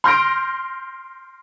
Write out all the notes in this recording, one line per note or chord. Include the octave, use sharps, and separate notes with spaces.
C6 F6 G6 A#6 D7